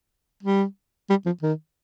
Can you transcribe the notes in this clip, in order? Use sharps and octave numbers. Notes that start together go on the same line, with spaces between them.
G3
G3
F3
D#3